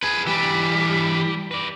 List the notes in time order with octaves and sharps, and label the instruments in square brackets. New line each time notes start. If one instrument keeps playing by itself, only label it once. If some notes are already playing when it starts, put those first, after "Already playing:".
[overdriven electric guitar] G#4 B4 [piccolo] G#6
[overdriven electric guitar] E3 G4 [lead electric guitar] G3 [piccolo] B6
[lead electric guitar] B4 D5